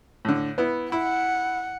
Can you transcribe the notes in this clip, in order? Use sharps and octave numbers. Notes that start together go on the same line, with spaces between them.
A2 D3
B3 E4
E4 F#5